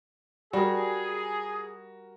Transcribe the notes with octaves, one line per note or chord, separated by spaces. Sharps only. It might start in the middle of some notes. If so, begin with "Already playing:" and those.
G3 F#4 G#4 A#4